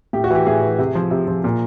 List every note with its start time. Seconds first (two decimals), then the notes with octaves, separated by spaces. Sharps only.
0.13 A2 G4
0.24 F#4
0.30 E3 G4
0.47 A2 G#4
0.62 E3
0.79 C3
0.95 F3
1.11 C3
1.28 F3
1.44 A#2